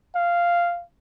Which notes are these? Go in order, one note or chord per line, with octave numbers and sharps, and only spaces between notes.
F5